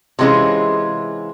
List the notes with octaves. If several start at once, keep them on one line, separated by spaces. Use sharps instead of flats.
C3 E3 G#3 C#4 F4